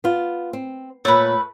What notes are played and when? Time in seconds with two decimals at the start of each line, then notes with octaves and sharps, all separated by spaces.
0.04 B3 F4
0.53 C4
1.05 A#2 A3 B4 C#5